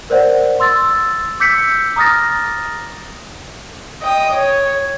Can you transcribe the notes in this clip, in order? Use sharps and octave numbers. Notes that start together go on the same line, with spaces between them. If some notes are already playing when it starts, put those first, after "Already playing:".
A#4 C5 D5 F#5
C6 E6 A6
D6 E6 G6 B6 C#7
A#5 D6 D#6 F6 A6 A#6
D#5 G5 D#6
C#5